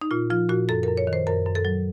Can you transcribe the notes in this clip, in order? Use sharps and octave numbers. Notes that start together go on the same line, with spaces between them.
D#4
A#2 F4
F3 F4
A#2 F#4
F#2 A4
A#4
F#2
C#5
D#3
C5
F#2 A#4
F#2
A4
F#3